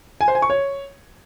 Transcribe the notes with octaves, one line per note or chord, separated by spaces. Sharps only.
G#5
C5
G#5
C#6
C#5